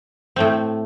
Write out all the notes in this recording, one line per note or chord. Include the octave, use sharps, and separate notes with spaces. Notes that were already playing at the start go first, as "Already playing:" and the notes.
A2 A3 C4